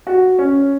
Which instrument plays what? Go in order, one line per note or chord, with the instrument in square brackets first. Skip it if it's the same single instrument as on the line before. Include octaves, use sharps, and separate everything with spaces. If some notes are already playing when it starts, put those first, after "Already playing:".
[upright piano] F#4
C#4